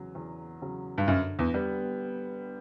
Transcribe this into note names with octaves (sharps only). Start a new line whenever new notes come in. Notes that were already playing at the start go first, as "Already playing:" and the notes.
Already playing: E2 C#3 F#3
E2
C#3 F#3
G2
F#2 D3
E2
G3 B3